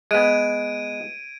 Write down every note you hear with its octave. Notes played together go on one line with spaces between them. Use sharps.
G#3 B3 G#6 D7 D#7